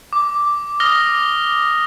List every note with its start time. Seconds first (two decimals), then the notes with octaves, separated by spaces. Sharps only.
0.13 D6
0.80 D#6 F6 A#6 G7